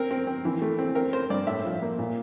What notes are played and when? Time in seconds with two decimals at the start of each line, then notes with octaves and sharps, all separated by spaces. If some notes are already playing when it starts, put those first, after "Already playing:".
Already playing: C4 A#4
0.11 C4
0.27 C4
0.45 E3
0.62 A3
0.79 C4
0.95 C4 A#4
1.13 C4 C5
1.30 G2 D5
1.47 A2 E5
1.64 F3
1.82 A#3
1.99 A#2